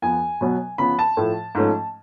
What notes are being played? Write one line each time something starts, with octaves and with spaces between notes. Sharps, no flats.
F2 F3 B3 G#5
B2 F#3 B3
C#3 F3 B3 B5
A5
A2 F3 A3
G#2 F3 A3 C#4